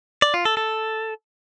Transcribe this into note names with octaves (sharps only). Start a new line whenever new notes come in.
D5
F4
A4
A4